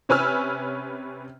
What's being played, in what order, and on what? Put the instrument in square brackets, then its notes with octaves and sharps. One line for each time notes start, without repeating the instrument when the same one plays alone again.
[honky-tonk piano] C3 C#4 B4 G#5 E6 F6